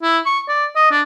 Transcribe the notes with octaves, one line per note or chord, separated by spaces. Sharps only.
E4
C#6
D5
D#5
D4